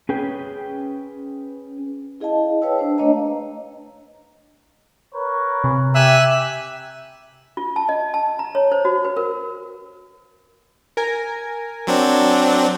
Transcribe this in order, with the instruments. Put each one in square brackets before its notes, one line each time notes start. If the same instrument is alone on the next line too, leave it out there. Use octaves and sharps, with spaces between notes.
[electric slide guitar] C#4 G#4 B4 G5
[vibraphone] E4 G#4 D#5 F5 A5
B4 C#5 F5 G5 A5 E6
D4 C5
A3 D4 C#5 D#5 F5 A#5
[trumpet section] A#4 B4 C#5
[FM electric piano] C3
[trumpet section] G4 [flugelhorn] E5 [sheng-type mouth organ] G#5 E6 F#6
[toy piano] F4
A5
D#5
A5
A#5
C#5
C5
F#4
B4
A#4
[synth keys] A#4 G#5
[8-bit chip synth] F#3 C4 D4